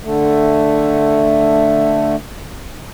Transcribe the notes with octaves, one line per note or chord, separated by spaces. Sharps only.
D3 A3